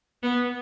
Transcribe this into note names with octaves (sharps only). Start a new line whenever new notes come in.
B3